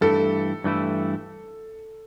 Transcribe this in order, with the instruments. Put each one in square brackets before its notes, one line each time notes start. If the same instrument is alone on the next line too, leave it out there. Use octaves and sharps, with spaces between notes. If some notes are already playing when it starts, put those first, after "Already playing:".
[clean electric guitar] G2 E3 A3 E4 [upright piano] A4
[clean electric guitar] G2 E3 A3 E4